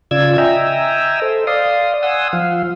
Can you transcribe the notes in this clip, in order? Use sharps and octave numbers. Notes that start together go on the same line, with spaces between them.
C#3 F4 D5 E6 G#6
D#5 E5 G5 G#5 A#5 E6
A4 C5
D5 F5 C6 D#6
F#5 G#5 C6 D#6 E6
F3 F5